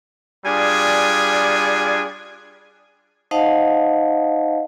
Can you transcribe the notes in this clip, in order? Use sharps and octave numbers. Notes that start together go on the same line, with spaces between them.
G3 D4 F4 G#4 G#5
D#4 C5 D#5 F5 F#5 A5